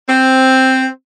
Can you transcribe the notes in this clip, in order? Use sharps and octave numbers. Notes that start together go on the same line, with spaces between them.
C4